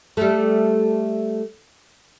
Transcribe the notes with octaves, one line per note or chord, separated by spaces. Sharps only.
G3 A3